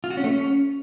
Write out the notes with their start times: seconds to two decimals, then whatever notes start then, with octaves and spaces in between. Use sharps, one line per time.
0.04 F4
0.11 F#4
0.17 C#4
0.24 A3
0.31 C#4